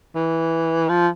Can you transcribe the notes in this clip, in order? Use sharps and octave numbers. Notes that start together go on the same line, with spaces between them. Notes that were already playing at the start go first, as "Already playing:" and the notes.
E3
F3